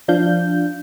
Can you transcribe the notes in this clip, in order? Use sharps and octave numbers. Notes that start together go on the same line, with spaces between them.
F3 D4 F5 G6